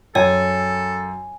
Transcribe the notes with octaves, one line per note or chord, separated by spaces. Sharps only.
F#2 A4 C#5 G5 G#5